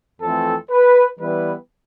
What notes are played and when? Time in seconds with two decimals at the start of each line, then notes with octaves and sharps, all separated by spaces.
0.21 F2 E3 A3 C4 A4
0.71 B4
1.20 E3 G3 B3 E4 B4